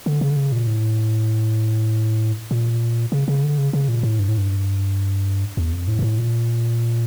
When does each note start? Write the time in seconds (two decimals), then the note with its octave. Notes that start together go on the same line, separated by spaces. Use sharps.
0.06 D3
0.21 C#3
0.30 D3
0.36 C#3
0.52 A#2
0.67 A2
2.51 A#2
3.12 C#3
3.28 C#3
3.43 D3
3.58 C#3
3.73 C#3
3.88 A#2
4.03 A2
4.19 G2
4.28 A2
4.38 G2
5.57 E2
5.72 F2
5.87 A2
5.99 G2
6.02 A2
6.18 A#2